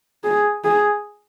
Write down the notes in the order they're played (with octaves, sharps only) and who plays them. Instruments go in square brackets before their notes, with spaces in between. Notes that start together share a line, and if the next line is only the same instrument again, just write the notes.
[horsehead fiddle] G#4
G#4